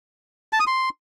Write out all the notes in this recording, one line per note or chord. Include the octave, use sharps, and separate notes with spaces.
A5
D#6
C6